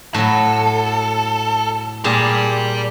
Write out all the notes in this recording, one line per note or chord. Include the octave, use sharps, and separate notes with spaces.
A2 F#3 A4
A#2 G4 G#4 D5 A5